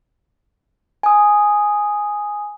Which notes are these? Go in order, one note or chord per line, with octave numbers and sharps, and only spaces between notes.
G#5 D#6